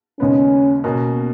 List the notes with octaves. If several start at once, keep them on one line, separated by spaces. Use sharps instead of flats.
D#2 C#3 G#3 B3 C#4
B2 A#3 C#4 F#4